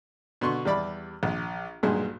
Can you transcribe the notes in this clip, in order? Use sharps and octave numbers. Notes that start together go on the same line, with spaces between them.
B2 D3 C6 C#6
E2 G3 D5 B5
A#1
B1 G2 A#2 G#3